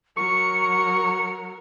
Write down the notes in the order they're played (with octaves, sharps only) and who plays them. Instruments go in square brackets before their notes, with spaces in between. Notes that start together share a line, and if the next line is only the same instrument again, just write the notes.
[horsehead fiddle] F#3 A#4 [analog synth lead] C#6 [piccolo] C#7